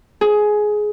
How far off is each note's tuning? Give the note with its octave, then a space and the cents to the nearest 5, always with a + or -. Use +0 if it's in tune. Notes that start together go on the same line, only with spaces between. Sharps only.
G#4 +15